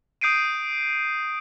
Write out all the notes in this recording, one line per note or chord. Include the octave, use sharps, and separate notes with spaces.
D#6 G6 C7 D7 D#7